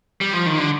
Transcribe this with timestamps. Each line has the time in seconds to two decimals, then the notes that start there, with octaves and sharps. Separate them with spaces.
0.21 G3
0.33 F3
0.46 D#3
0.58 D3